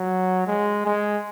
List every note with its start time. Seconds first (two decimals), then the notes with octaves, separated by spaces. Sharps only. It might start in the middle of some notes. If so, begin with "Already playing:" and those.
Already playing: F#3
0.47 G#3
0.85 G#3